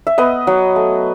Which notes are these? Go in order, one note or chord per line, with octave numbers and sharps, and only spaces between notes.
E5
B3 B4 D#5
F#3
A3